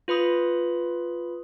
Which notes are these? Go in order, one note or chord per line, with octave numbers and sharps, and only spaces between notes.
F4 B4 B5 D#6